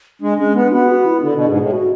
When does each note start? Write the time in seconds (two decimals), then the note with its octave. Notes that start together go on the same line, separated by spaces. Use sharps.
0.21 G#3 D4
0.38 G#3 C#4
0.55 B3 D4
0.72 B3 F#4
0.89 F#4
1.06 E4
1.22 D3 D4
1.35 B2
1.47 G#2 G#4
1.60 A2
1.72 F#4